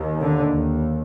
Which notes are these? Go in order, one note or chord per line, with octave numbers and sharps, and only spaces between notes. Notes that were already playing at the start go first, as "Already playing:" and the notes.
Already playing: D#2
D3
D#2